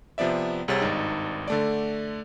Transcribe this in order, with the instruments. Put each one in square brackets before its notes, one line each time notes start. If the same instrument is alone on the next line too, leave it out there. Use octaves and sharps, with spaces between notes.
[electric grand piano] C3 F3 B3 D5 E5
C2 C3 G#4 C#5 A6
G#1 G2 D#4
D3 A3 D5